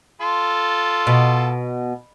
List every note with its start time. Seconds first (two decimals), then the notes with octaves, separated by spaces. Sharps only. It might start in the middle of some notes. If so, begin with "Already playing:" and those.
0.21 F4 A4 C6
1.07 B2